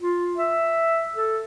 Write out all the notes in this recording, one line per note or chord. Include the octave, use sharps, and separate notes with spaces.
F4
E5
A4